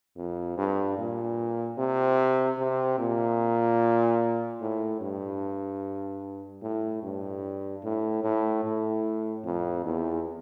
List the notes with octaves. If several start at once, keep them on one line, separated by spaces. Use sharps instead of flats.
F2
G2
A#2
C3
C3
A#2
A2
G2
A2
G2
A2
A2
A2
F2
E2